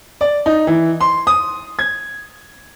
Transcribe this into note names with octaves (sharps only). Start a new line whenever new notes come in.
D5
D#4
E3
C6
D#6
G#6